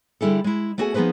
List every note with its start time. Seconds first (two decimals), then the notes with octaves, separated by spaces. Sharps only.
0.21 D3 G3 E4 G#4 A4
0.44 G#3 E4
0.78 A3 B3 F#4 G#4 F#5 G#5
0.94 F3 B3 D#4 G#4 B4 C5